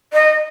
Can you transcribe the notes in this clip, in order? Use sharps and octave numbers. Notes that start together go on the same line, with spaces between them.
D#5